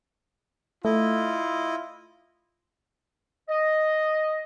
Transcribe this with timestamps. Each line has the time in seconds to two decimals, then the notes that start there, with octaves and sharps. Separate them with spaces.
0.85 A3 E4 F4 D#5
3.49 D#5